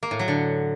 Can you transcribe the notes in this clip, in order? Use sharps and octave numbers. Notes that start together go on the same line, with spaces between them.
A#3
A2
F#3
D3